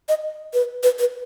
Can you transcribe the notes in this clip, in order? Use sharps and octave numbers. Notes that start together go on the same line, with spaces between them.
D#5
B4
B4
B4